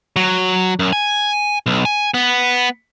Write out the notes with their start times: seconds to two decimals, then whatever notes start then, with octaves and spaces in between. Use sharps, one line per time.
0.16 F#3
0.79 F#2
0.93 G#5
1.66 B1
1.85 G#5
2.14 B3